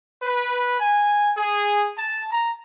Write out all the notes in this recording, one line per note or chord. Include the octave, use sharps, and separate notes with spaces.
B4
G#5
G#4
A5
A#5